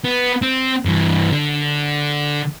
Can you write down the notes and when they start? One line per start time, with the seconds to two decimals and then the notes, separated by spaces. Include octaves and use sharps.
0.05 B3
0.42 C4
0.85 G2 E3
1.33 D3